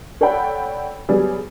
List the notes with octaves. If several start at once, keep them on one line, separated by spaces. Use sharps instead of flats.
A4 C#5 D5 F#5 G5 B5
F#3 G3 B3 G#4